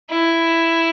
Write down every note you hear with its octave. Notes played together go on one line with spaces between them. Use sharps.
E4